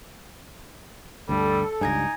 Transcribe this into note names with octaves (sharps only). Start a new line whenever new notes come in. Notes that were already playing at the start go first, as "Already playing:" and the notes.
D2 G2 G3 A4
C#2 G2 D#4 G#5 G#6 A#6